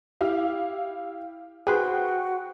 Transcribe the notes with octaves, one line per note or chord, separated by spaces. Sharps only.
E4 G4 F5
F#4 G#4 B4 C5 G5